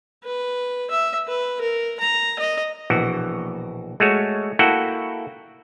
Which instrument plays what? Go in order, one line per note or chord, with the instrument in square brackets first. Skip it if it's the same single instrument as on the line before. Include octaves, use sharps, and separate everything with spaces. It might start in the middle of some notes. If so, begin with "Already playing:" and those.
[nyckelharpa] B4
E5
B4
A#4
A#5
D#5
[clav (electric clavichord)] A#1 B2 E3 F#4
G#3 A3 F#4 C#5
A#3 E4 F#4 A4 F#5 G5